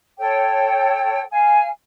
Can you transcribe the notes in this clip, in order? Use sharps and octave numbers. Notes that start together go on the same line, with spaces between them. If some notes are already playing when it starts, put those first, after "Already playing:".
A4 C#5 G5
F5 G#5